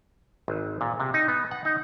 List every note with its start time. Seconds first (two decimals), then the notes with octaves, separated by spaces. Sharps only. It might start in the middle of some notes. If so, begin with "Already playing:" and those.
0.48 G#1
0.81 A#2
1.00 C3
1.14 D#4
1.28 B3
1.51 F#5
1.65 D#4